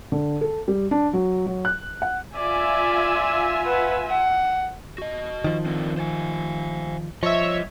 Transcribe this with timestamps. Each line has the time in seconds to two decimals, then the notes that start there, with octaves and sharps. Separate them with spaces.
0.12 D3
0.41 A4
0.68 G3
0.91 D4
1.13 F#3
1.46 F#3
1.65 F#6
2.02 F#5
2.36 F4 D5 E5 G#5
3.65 B4 F#5
4.08 F#5
4.98 F#4 D#5
5.44 D#3 F3
5.66 C4 D4 A#4
5.98 C5 F5 G#5
7.23 G2 F3 C#5 D#5 E5